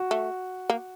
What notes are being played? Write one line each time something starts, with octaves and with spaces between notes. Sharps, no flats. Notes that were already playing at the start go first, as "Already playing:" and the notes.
Already playing: F#4
A3
A#3